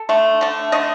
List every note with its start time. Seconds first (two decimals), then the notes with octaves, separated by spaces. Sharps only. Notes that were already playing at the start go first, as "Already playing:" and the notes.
Already playing: A4
0.09 D3 A3
0.41 D3 A3
0.72 D3 A3 D#5